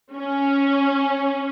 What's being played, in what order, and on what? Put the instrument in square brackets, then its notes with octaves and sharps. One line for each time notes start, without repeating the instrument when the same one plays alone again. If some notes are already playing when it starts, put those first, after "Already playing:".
[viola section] C#4